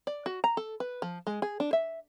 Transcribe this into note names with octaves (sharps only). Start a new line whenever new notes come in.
D5
F#4
A#5
A4
B4
F3
G#3
G#4
D4
E5